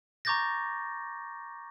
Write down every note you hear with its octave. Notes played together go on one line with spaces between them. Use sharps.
A#5 C#6 D6 G6 A6 A#6